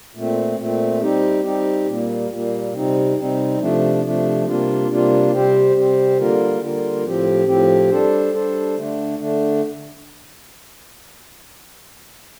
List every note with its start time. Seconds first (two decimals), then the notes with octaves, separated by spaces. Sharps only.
0.15 A#2 A3 C4
0.58 A#2 A3 C4
1.02 G3 C4 D#4 G4
1.44 G3 C4 D#4 G4
1.86 A#2 G3 A#3
2.29 A#2 G3 A#3
2.73 C3 G3 C4 D#4
3.17 C3 G3 C4 D#4
3.59 C3 F3 A3 D4
4.03 C3 F3 A3 D4
4.45 C3 G3 A#3 D4 F4
4.88 C3 G3 A#3 D4 F4
5.31 C3 G3 C4 G4 C5
5.74 C3 G3 C4 G4 C5
6.17 D3 G3 A#3 F4 A#4
6.60 D3 G3 A#3 F4 A#4
7.04 A2 F3 C4 G4
7.47 A2 F3 C4 G4
7.89 G3 D4 A4 C5
8.33 G3 D4 A4 C5
8.76 D3 A3 D4
9.18 D3 A3 D4